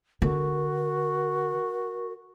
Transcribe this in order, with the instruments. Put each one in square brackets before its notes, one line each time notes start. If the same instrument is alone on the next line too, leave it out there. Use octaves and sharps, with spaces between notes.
[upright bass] D3 [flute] F#4 [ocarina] A#4